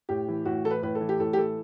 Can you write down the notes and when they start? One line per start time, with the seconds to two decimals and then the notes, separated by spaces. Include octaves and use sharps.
0.09 A2 G4
0.28 E3
0.45 A2 F#4
0.65 E3 A4
0.71 B4
0.83 A2 B4
0.95 A4
1.00 E3
1.09 G4
1.20 A2 A4
1.33 G4
1.37 E3 A4